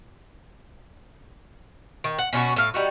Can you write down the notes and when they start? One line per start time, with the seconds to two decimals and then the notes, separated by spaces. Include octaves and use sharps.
2.04 D#3
2.18 F#5
2.33 B2 C#4 F4 F#4
2.56 A2 F5
2.74 G3 D#4 F#4